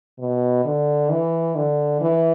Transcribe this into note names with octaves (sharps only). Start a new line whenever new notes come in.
B2
D3
E3
D3
E3